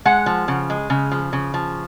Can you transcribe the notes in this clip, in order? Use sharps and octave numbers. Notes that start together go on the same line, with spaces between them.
G#3 F#5
F3
C#3
G#3
C#3
F3
C#3
F3